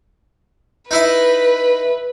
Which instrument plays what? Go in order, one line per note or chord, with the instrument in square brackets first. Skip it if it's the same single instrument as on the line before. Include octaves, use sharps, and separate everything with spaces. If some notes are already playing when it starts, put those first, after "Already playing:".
[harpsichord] D#4 E4 E5 [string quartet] B4